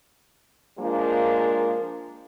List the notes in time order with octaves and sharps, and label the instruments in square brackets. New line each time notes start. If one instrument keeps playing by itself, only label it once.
[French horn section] F3 G#3 A#3 D4 A#4